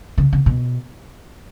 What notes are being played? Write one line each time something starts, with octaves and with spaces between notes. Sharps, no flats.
C#3
C#3
B2